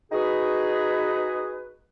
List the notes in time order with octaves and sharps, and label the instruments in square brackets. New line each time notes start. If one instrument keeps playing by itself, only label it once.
[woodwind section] D#4 F#4 G#4 B4